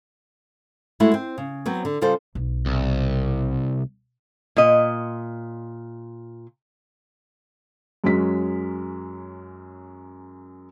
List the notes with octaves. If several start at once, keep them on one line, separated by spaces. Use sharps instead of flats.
G#3 A3 E4 F#4 G#4
C4
C#3
F#3 B3 C4
D3
C#3 G3 F4 A4 C5
B1
C2
A#2 D#5
F#2 F#3 G#3 C#4 B6